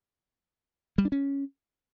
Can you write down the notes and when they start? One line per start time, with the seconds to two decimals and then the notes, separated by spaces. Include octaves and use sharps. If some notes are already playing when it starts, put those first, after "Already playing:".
0.98 G3
1.05 D4
1.12 C#4